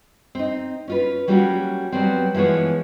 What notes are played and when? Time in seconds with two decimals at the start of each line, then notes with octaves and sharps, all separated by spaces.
0.35 C4 D#4
0.88 C#4 F4 B4
1.27 F#3 G3 A#3 C#4 F4 F#4
1.92 F#3 G3 B3 C4
2.34 E3 F3 G#3 B3 C#5